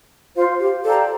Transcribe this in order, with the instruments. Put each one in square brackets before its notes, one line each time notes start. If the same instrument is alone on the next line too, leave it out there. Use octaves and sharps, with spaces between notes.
[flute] F4 [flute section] C5 F5 C6
[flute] G4
[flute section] G4 D5 F5 A#5 [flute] A4